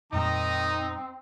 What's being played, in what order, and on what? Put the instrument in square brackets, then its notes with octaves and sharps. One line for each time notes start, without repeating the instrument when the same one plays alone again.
[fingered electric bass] F2 A#2 G3 [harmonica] D#3 A#5 D#6 [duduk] C4 [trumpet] D#4